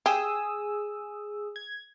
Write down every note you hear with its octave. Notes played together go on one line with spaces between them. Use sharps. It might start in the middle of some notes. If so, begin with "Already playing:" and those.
G4 G#4 D#6 E6
G#6